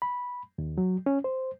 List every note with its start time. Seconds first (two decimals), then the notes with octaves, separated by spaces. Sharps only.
0.02 B5
0.58 D#2
0.78 F#3
1.06 C#4
1.24 C5